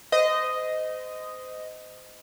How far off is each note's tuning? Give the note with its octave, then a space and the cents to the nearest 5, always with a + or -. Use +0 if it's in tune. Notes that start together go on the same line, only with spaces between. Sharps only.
C5 -30 D#5 +0